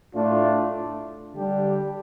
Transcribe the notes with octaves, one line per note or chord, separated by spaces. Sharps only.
A2 A3 D4 F4
D3 G3 D4 G4